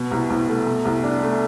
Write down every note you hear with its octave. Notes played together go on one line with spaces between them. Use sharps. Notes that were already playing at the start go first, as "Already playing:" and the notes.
Already playing: B2
C2
C2
A3
B2
C2
D4
A3